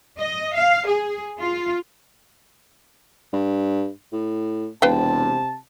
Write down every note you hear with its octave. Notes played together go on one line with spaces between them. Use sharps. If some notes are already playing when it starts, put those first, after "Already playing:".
D#5
F5
G#4
F4
G2
A2
E1 C3 B4 F5 G5 A5